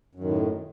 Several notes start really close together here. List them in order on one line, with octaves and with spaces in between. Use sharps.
F#2 D#3 A2